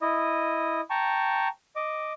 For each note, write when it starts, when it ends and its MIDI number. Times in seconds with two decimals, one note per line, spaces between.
0.02 0.81 64
0.02 0.81 75
0.02 0.81 87
0.90 1.48 79
0.90 1.48 81
0.90 1.48 82
0.90 1.48 85
1.76 2.13 75
1.76 2.13 86